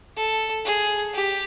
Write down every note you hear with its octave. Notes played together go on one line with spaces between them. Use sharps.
A4
G#4
G4